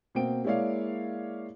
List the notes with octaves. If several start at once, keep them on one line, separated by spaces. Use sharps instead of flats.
B2 A#3 C4 G5 D7
G#3 A#3 E4 C#5 D5 F5